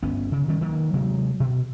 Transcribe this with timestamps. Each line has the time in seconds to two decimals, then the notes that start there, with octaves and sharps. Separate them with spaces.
0.03 G1 B3 C#4
0.32 C#3
0.48 D#3 G3 C#4
0.61 D#3 F#3 A#3
0.93 C3 F#3 G#3 A#3
1.40 B2